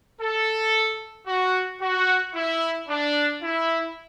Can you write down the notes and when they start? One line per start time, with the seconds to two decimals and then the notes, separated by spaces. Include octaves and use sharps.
0.21 A4
1.27 F#4
1.81 F#4
2.35 E4
2.89 D4
3.43 E4